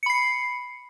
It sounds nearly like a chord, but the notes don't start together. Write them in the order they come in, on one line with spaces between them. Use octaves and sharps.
C#7 B5 C7